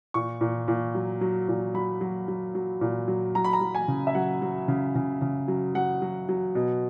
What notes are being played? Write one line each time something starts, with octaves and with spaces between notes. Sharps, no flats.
A#2 C#6
A#2
A#2
F#3
F#3
A#2
F#3 B5
F#3
F#3
F#3
A#2
F#3
F#3 A#5
B5
A#5
F#3
G#5
C#3
E5
F#3 F#5
F#3
C#3
C#3
C#3
F#3
F#3 F#5
F#3
F#3
B2